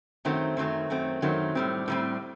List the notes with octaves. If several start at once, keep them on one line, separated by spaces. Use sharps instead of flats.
F#2 D#3 F#3 A3 C4
F#2 D#3 F#3 A3 C4
F#2 D#3 F#3 A3 C4
F#2 D#3 F#3 A3 C4
A2 G3 C4
A2 G3 C4